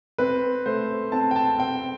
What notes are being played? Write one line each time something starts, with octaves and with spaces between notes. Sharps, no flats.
C4 B4
A3 C5
C4 A5
G5
A5
C4 G5